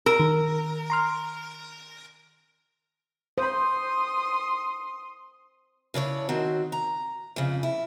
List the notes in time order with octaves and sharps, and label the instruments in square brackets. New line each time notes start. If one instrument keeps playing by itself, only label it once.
[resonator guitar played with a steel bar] A#4 [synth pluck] E6
[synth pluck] D#3
A#5 C6 F6
[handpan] C5 [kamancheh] C6 D#6
[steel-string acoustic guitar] C#3 D4 E4 C#5
D#3 C4 F#4
A#5
F2 C#3
E4